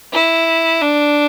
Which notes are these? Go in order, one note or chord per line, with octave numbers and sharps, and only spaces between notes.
E4
D4